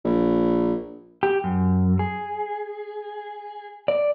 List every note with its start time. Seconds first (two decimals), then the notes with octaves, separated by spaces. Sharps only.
0.05 A#1
1.23 G4
1.44 F#2
1.99 G#4
3.88 D5